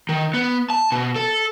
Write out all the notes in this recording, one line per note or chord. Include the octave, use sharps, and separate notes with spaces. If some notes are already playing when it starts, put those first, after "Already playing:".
D#3
B3
A5
B2
A4